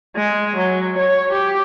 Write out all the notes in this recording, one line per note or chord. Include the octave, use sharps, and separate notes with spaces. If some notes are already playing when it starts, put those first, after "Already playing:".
G#3
F#3
C#5
G4